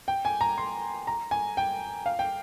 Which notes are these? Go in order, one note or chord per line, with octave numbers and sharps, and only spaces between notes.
G5
G#5
A#5
C6
A#5
G#5
G5
F5
G5